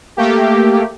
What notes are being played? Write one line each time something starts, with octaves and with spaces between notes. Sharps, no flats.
A3 A#3 G4